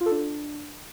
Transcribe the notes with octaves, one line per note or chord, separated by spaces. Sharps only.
F4
A4
D4